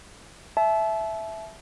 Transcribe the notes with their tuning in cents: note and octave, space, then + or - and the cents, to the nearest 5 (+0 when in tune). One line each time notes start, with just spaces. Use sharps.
E5 +0 A5 -35